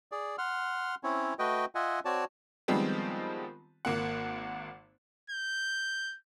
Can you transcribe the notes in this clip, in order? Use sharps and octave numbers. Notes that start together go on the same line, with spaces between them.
G#4 D5
F#5 C6 F6
C4 C#4 E4 C#5
A3 F#4 B4 D#5 G5
F4 D#5 E5 F#5 G#5
C4 F#4 C#5 D5 A5
D#3 F3 G3 G#3 B3 C4
G#1 A#3 F#5
G6